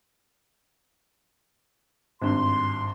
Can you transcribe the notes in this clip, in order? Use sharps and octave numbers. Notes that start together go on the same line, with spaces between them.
G#1 G2 C6